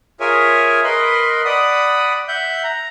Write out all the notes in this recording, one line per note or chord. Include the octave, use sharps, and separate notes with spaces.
F4 G#4 A#4 C#5 E5 G#5
A#4 B4 D#5 B5 C6
D5 F#5 B5 D#6
E5 F#5 G6
A#5